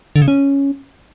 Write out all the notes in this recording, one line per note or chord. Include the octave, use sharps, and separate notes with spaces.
D3
C#3
C#4